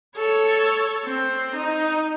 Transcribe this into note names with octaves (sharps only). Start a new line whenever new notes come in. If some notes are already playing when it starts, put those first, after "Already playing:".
A4 C#5
C4
D#4